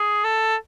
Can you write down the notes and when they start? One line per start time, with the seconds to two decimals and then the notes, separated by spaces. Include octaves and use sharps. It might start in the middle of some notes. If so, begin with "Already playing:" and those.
Already playing: G#4
0.24 A4